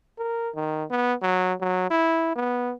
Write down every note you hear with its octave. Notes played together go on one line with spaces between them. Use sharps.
A#4
D#3
B3
F#3
F#3
E4
B3